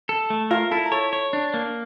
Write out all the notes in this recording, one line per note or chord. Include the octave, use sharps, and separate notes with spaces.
A4
A3
F4 A#4 F5
E4 A4 A5
A#5
A4 C#5 A5
C#5
D4
A#3